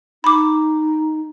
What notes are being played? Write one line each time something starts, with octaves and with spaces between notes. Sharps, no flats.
D#4 B5 D6